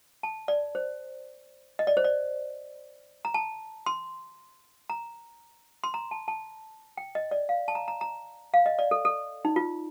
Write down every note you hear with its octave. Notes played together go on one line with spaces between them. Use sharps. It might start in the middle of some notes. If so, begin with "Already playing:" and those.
A5
D5
C5
D#5
D5
C5
D5
A#5
A5
C6
A#5
C6
A#5
A5
A5
G5
D#5
D5
F5
A5
A#5
A#5
A#5
F5
D#5
D5
A4
A4
D#4
F4